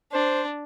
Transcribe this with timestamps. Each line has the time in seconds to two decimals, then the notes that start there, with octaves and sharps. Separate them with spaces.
0.13 D4 C5